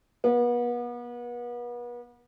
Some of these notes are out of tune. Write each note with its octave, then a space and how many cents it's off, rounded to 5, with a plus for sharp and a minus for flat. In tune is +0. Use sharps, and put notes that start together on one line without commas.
B3 -35